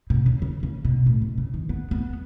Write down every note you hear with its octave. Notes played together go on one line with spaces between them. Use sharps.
B2
C#3
C#3
C#3
B2
A2
B2
C#3
D#3
B3
B3